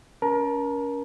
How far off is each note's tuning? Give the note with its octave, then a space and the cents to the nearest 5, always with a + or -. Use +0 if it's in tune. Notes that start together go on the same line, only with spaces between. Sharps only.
C#4 +25 A#4 +30 A5 +0